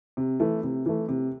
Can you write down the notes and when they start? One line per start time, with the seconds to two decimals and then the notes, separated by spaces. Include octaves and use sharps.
0.17 C3
0.40 E3 A3
0.63 C3
0.86 E3 A3
1.09 C3